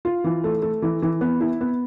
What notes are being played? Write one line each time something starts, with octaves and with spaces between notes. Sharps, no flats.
F4
E3
A3
A3
E3
E3
B3
E4
B3